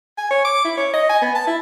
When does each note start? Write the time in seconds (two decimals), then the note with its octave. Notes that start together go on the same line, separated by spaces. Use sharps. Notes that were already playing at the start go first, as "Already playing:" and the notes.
0.18 G#5
0.30 C#5
0.44 D6
0.65 E4
0.77 C#5
0.94 D#5
1.09 G#5
1.22 B3
1.35 A5
1.47 E4